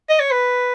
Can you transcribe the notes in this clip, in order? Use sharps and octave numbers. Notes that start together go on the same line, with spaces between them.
D#5
C#5
B4